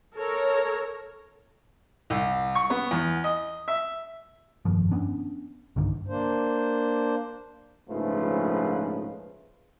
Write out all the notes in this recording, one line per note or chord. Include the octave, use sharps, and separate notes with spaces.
A4 A#4 C#5
C2
C#6
B3
E2
D#5
E5
F1 G2 D#3 F3
B3 C#4 D4
B1 G2 D3 D#3
A#3 D4 C5
A#1 G#2 C#3 F3 A3 B4